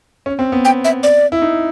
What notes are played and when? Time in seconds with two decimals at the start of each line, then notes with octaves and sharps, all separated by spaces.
0.26 C#4
0.39 C4
0.52 B3
0.65 G5
0.84 E5
1.03 D5
1.32 E4
1.42 D#4